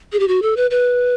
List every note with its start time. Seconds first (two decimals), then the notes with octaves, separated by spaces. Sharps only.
0.13 G#4
0.19 G4
0.28 F#4
0.42 A4
0.57 B4
0.71 B4